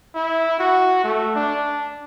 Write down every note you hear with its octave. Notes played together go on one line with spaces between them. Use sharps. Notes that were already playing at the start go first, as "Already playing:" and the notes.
E4
F#4
A3
D4